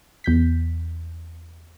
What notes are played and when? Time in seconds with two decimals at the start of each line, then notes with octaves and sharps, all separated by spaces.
0.24 E2 G6 B6